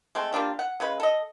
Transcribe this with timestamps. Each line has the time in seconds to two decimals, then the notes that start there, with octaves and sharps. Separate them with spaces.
0.15 G#3 A3 C4
0.32 G3 A#3 D4 F4
0.59 F#5
0.80 C#3 G#3 B4
1.00 A4 D#5